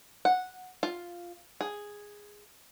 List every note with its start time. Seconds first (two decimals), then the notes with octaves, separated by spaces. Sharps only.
0.25 F#5
0.83 F4
1.61 G#4